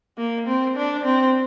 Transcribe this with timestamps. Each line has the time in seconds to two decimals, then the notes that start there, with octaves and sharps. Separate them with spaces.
0.18 A#3
0.47 C4
0.76 D4
1.05 C4